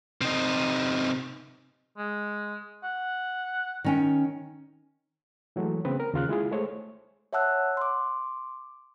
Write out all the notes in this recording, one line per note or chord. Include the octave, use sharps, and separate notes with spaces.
C3 D#4
G#3
F#5
D#3 C#4 G5
E3 F#3 G#3 A3
C#3 B3 C4 B4
A#4
D#2 C#3 F4 F6 F#6
G#3 E4 F4 G#4
G#3 A3 C5 C#5
C#5 E5 F#5 A5 E6 F#6
C6 D6